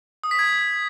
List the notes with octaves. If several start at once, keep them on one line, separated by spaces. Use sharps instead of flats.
D#6
B6
G#6